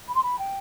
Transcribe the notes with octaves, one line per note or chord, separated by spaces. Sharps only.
B5
C6
B5
G5